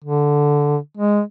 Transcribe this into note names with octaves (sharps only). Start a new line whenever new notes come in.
D3
G#3